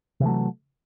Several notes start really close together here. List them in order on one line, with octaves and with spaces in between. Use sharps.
C3 E3 A3 F#3